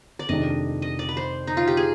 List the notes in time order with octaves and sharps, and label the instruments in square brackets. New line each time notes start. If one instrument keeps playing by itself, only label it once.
[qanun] D5
[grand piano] F2 C3 D#3 G#3 D4 [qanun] D#5
[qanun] D#5
D5
B4
C5
D#4
F4
G4
G#4